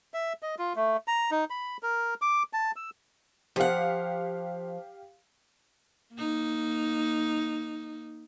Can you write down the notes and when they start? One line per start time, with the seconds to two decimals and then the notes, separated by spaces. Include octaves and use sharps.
0.14 E5
0.43 D#5
0.59 F4
0.76 A3
1.08 A#5
1.31 D#4
1.50 B5
1.83 A#4
2.22 D6
2.53 A5
2.76 E6
3.56 F3 G4 F5 F#5
6.14 A#3 D#4